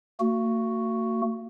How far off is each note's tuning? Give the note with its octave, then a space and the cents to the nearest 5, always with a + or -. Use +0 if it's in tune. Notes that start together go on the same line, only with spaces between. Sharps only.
A#3 -45 F#4 +0